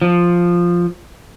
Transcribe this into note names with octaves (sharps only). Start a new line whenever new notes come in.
F3